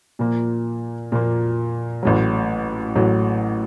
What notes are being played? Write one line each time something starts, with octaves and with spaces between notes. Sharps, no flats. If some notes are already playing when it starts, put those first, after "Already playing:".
A#2 F3 A#3
A#2 F3 A#3
A1 A2 F#3
A1 A2 F#3